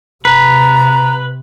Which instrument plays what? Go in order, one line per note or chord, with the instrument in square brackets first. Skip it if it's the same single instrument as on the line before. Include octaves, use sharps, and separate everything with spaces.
[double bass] C3 [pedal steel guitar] B4 [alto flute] A#5